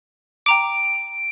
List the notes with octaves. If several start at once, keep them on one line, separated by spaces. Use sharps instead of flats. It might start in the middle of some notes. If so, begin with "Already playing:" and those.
G5 A#5 D6 D7